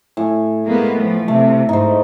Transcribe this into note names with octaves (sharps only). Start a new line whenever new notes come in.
A2 G#5
G#3 A#3 B3
F3 A3
C3 A3
G#2 D#4 C5